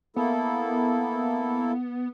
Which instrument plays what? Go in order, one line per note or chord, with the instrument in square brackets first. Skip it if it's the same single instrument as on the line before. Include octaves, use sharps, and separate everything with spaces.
[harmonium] A#3 E4 A4 [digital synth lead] B3